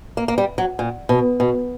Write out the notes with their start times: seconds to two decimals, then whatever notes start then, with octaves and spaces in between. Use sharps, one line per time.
0.17 A#3
0.28 A#3
0.38 G3
0.58 F#3
0.79 A#2
1.09 B2
1.40 B2